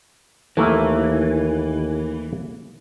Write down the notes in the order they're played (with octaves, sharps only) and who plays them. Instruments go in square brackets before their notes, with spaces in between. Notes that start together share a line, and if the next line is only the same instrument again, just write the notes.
[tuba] D#2 [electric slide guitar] E3 [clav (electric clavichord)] A3 A#3 E4